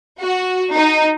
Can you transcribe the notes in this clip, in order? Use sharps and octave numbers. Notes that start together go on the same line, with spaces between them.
F#4
D#4